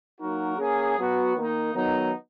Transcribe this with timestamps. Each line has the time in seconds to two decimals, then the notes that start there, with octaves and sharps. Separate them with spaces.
0.20 F#3 A#3 D#4 F#4 A#4
0.58 A#3 C#4 G#4
0.97 F#3 B3 F#4
1.35 D#3 A#3 D#4
1.74 D#3 F#3 B3 D#4